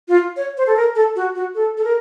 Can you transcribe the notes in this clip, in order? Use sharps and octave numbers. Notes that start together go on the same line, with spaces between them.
F4
C#5
C5
A4
A#4
A4
F#4
F#4
A4
A4
A#4